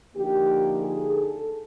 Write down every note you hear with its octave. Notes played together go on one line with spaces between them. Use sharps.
D3 F3 A#3 D#4 G4
G#4
A4